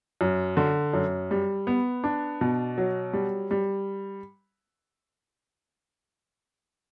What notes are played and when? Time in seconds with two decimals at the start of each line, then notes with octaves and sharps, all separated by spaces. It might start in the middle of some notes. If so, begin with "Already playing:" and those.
0.21 F#2
0.57 D3
0.94 F#2
1.31 G3
1.67 B3
2.04 D4
2.41 B2
2.78 F#3
3.13 G3
3.51 G3